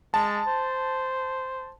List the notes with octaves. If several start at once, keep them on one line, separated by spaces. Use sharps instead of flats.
G#3 A5
C5